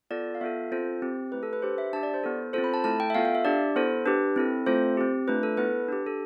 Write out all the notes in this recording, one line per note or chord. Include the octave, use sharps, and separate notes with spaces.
B3 F4 A4 D5
F5
B3 F4 A4 E5
C4 F4 A4 C5
C4 G4
A3 E4 G4 B4
A4
B4
D4 G4 C5
E5
D4 G4 A5
D5
C5
B3 E4 A4
C4 F4 A4 C5
B5
A5
A3 E4 A4 A5
G5
E5
B3 F4 A4 F5
F5
E5
D4 G4 D5
B3 E4 A4 C5
D4 G4 B4
C4 E4 A4
A3 C4 F4 A4 C5
C4 G4
A3 D4 F4 B4
A4
B3 E4 A4 B4
D4 G4
A4